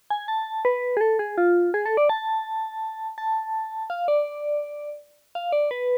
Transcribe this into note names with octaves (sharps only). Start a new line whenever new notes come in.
G#5
A5
B4
G#4
A4
G#4
F4
G#4
A4
D5
A5
A5
F5
D5
F5
D5
B4